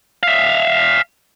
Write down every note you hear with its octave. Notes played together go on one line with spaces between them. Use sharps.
E5 F5